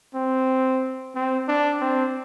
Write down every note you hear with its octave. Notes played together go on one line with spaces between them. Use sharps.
C4
C4
D4
C4